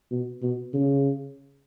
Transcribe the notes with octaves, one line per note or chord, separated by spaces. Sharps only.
B2
B2
C#3